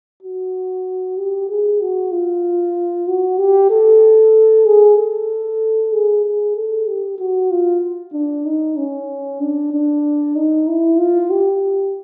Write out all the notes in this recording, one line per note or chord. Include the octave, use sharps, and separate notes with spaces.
F#4
G4
G#4
F#4
F4
F#4
G4
A4
G#4
A4
G#4
G#4
A4
G4
F#4
F4
D4
D#4
C#4
D4
D4
D#4
E4
F4
G4